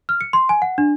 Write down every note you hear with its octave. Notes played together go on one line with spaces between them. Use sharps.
F6
C#7
C6
G#5
F#5
D4